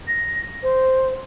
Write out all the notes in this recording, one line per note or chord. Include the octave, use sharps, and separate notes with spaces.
A#6
C5